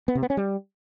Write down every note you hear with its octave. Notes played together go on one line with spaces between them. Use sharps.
B3
C3
B3
C#4
G3